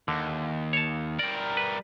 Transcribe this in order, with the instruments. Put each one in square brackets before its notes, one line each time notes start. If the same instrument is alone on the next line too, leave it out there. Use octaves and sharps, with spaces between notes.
[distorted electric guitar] D#2 [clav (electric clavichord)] D3
[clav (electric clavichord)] C#5 A5
[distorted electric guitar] G3 A#4 [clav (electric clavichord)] D5
[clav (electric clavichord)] B4